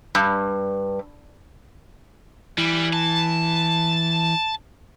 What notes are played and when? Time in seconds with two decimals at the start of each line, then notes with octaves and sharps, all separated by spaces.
0.15 G2
2.58 E3 G3
2.93 A5